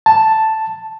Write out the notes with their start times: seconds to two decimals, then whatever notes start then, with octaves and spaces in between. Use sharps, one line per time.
0.06 A5